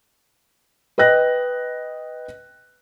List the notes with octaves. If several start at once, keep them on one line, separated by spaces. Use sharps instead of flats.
B4 D#5 G5 F#6 A#6